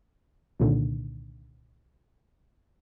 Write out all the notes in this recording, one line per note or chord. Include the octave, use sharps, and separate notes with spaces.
C2 A#2 D3 D#3